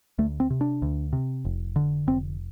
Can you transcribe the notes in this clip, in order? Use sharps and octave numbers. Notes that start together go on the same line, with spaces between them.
D2 A3
C4
C3
D4
D2
C3
F1
D3
F1 C4